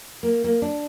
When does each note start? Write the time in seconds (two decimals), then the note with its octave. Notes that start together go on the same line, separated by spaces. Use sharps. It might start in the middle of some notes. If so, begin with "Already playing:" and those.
0.23 A#3
0.44 A#3
0.62 D4